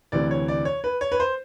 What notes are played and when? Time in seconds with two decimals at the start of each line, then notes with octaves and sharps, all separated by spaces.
0.12 D2 C3 E3 D5
0.31 C#5
0.48 D5
0.65 C#5
0.84 B4
1.01 C#5
1.12 B4
1.20 C5